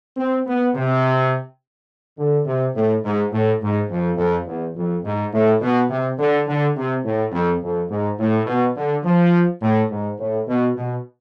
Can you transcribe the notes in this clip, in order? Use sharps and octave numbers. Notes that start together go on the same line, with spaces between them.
C4
B3
C3
D3
C3
A2
G#2
A2
G#2
F2
F2
E2
F2
G#2
A2
B2
C3
D3
D3
C3
A2
F2
F2
G#2
A2
B2
D3
F3
A2
G#2
A2
B2
B2